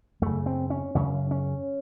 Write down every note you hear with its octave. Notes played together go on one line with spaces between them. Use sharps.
F#2 C#3 A3
C4
C#4
F#2 C#3 C#4
C#4